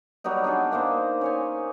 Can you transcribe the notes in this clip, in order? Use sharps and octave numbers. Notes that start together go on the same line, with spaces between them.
F#3 G3 B3 D#4
D4 D#4 G#4 A4
D#3 A#3 A#4 C5
C#4 C#5 G#5